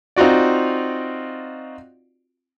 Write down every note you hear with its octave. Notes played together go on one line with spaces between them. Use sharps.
C4 D#4 F4 F#4 D5